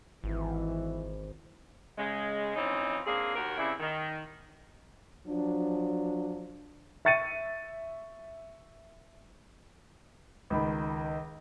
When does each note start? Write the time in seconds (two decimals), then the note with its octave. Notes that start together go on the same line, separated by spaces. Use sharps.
0.24 G#1 E3
1.98 C#3 G#3
2.56 E3 F3 C4 C#4 D#4
3.06 A#3 C4 D4 G#4
3.35 D#2 F#4 A#4
3.58 C#3 G3 C4 E4
3.80 D#3
5.27 F3 F#3 D4
7.05 E5 C#6 A6 C#7 D#7
10.50 C#2 D#3 B5